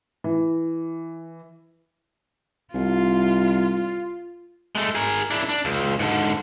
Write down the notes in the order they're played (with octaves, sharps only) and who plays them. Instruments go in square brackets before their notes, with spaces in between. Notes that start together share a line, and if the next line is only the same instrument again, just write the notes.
[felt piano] E3
[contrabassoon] C2 [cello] F4
[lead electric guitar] G#3 A3
G#4 A#4
D4 E4
D4
C#2
G#2 D3